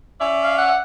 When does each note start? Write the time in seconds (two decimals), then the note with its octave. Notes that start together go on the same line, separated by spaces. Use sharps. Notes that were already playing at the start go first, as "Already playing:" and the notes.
0.21 C#4 D5 E5
0.44 F5
0.58 F#5